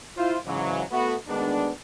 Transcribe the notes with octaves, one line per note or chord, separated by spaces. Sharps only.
E4 F4 C5
G#2 C#3 E3 F#3
A3 B3 F#4
D2 D#3 G#3 B3 D4